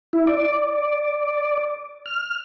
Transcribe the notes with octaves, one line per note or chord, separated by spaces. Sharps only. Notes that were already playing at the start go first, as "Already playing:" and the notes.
E4
D5
F6